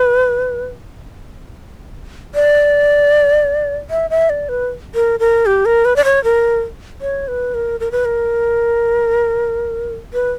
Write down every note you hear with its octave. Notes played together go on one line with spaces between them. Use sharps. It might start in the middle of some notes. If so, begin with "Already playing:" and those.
Already playing: B4
D5
E5
E5
D5
B4
A#4
A#4
G4
A#4
B4
D5
C#5
A#4
C#5
B4
A#4
A#4
B4
A#4
B4